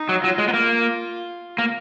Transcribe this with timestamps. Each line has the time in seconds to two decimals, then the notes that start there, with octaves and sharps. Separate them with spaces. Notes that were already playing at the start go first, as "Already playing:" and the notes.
Already playing: D#4
0.09 F#3
0.24 F#3 F4
0.38 G#3
0.48 B3
0.54 A#3
1.58 A#3